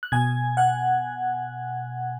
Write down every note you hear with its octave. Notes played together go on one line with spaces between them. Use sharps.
F#6
B2 G#5 G#6
F#5 F#6